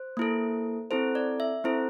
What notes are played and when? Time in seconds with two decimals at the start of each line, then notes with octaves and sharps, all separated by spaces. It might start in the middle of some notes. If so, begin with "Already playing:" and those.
Already playing: C5
0.17 A#3 E4 A4
0.91 C4 E4 A4 C5
1.15 D5
1.40 E5
1.64 C4 E4 A4 C5